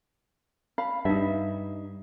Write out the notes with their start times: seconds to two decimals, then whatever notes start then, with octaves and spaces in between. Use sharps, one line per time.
0.78 F5 B5
1.05 G2 D#4 E5